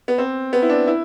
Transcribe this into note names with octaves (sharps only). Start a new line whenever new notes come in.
B3
C4
B3
E4
D4
E4